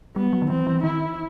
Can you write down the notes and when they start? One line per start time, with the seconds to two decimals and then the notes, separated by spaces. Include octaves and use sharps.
0.16 G3 B3
0.33 F#3
0.42 D#3
0.50 E3 C4
0.67 E3
0.83 D#3 E4